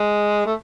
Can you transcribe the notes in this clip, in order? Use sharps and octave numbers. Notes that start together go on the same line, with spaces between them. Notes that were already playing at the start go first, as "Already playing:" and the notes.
Already playing: G#3
A3